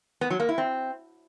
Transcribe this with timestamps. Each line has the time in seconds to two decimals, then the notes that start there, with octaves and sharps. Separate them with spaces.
0.21 B3
0.30 F#3
0.40 A#3
0.49 E4
0.58 C4